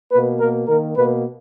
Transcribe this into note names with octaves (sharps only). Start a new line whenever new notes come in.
B2 A#3 B4
B2 A#3 A#4
D#3 A#3 A#4
B2 A#3 B4